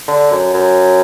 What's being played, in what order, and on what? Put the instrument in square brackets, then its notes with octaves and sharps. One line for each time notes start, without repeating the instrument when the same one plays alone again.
[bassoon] D3
F#2
F#2